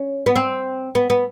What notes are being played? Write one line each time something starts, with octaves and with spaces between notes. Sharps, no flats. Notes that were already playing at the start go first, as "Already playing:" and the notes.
Already playing: C#4
B3
C4
B3
B3